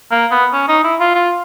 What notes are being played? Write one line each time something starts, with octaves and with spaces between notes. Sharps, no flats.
A#3
B3
C#4
D#4
E4
F4
F4